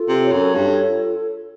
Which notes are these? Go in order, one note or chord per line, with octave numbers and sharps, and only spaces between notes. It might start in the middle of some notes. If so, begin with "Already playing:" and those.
Already playing: F4 A4
C3
C#5
F#2
G2 A4
F4